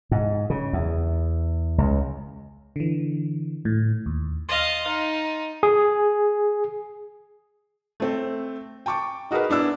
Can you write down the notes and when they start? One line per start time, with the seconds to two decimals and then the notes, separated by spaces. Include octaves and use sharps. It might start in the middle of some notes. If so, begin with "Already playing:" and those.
0.11 G#2
0.50 C#3
0.73 E2
1.78 C#2
2.76 D3 E3
3.65 A2
4.06 D#2
4.49 D#5 F5 C6 A6
4.87 D#4
5.63 G#4
8.00 A3 C4
8.86 G5 A5 C#6 D6
9.31 D#4 F#4 G#4 A#4 B4
9.49 B3 D4 E4 E6